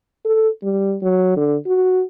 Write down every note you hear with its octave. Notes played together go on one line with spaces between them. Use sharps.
A4
G3
F#3
D3
F#4